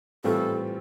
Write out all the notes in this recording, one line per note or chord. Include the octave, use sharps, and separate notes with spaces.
A2 E3 G3 C4 F4 A4